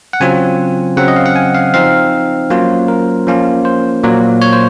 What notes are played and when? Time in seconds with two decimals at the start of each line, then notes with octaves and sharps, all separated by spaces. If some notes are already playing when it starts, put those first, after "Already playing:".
0.13 F#5
0.20 C#3 F#3 C4 F4 G#5
0.97 C#3 F#3 C4 F#5
1.08 D#5
1.16 F5
1.26 F#5
1.36 G#5
1.54 F5
1.74 F3 C4 D#4 F5
2.50 F#3 A#3 C#4 F4 C5
2.88 A#4
3.27 F3 A#3 C#4 F4
3.65 C5
4.03 A#2 F#3 A#3
4.42 C#5
4.53 C5